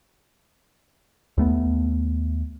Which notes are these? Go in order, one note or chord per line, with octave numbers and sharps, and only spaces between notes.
D#2 A3 B3